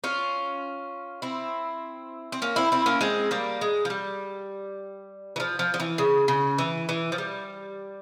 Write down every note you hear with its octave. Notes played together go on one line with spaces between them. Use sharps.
C#4 F4
C4 E4
C4
A#3 C#4
C4 E4
C4 E4
A#3 C#4
G#3 C4
G3 A#3
G#3
F3
G3
E3
F3
F3
F3
E3
C#3
C#3
E3
E3
F3
G3